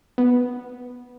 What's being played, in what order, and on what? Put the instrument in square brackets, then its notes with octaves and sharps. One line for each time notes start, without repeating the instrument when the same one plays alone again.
[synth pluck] B3